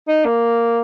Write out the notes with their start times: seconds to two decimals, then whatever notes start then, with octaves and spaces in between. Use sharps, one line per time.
0.08 D#4
0.25 A#3